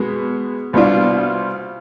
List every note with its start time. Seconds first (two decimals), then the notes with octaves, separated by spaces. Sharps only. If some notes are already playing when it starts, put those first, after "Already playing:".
Already playing: B2 G#3 B3
0.73 C2 B2 B3 D4 F4